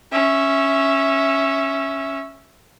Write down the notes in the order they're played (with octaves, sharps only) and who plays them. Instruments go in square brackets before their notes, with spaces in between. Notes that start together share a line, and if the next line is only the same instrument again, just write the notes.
[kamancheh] C#4 E5